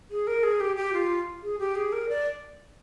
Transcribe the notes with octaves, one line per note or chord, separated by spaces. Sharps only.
G#4
A#4
G#4
G4
G4
F4
G#4
G4
G#4
A#4
D5